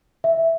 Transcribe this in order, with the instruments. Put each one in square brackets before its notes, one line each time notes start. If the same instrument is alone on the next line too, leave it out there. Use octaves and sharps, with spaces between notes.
[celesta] E5